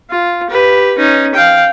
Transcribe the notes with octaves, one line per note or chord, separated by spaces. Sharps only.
F4
G4 B4
C#4 D#4
F5 G5